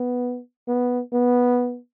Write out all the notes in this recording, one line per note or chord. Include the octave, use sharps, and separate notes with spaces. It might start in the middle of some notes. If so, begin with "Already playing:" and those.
Already playing: B3
B3
B3